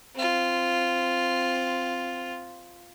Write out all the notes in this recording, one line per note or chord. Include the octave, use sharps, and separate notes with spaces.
C4 F4